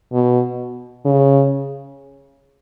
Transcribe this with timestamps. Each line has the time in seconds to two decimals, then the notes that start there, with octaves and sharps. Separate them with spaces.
0.13 B2
1.05 C#3